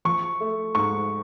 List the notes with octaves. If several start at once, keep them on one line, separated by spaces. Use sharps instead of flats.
F3 C#6
A3
G#2 C#6